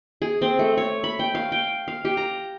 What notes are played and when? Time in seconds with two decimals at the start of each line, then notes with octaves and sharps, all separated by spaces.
0.22 G#4
0.42 C4
0.59 A3
0.77 C#5
1.04 B5
1.19 G5
1.35 F5
1.52 G5
1.88 F5
2.05 G4
2.17 A#5